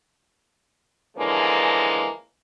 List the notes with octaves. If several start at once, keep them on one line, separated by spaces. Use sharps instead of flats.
D3 E3 F3 G#3 A#3 C#4